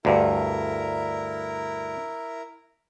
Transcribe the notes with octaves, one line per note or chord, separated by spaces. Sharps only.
D2 G2 E4 A#4